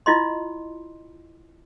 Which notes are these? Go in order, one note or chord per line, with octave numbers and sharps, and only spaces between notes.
E4 F4 D#5 C6